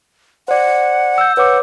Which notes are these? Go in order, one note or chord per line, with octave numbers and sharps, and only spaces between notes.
C5 D5 F#5
E6 G6
B4 C#5 F#5 D6